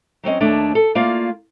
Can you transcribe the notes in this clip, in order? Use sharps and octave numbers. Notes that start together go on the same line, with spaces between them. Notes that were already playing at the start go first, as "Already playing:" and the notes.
F#3 C4 C#4 D#5
D#2 A3 D4 C#5 D5 A5
A4
A3 A#3 F4 D5 F5